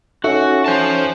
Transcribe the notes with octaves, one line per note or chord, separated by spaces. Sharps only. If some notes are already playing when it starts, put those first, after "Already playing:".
C#4 D#4 F#4 A4 E5
C#4 C5 A5